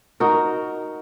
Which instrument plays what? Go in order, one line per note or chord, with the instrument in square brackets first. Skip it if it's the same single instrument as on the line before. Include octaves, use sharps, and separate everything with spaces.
[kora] D#4 F#4 A#4